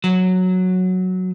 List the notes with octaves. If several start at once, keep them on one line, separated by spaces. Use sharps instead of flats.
F#3